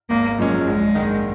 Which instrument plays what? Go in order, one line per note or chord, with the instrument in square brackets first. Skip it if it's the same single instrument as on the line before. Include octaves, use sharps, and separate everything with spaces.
[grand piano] G#1 [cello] A#3
[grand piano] F#2 F3 G#3 C#4
[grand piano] A#1 [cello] G#3
[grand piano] G#2 D#3